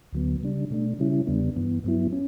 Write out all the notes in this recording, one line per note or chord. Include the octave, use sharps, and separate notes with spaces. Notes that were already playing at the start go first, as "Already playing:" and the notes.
D2 D3 F#3 B3
C#3 G3 D4
B2 A3 D4
C#3 G3 C#4 E4
E2 C#3 G3 B3 D4
G2 E3 B3
G2 F#3 B3 E4
C#4